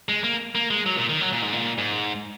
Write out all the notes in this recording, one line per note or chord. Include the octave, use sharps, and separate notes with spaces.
G#3
A#3
A#3
G#3
F#3
A#2
D#3
F#3
A#2
G#2
A#2
G#2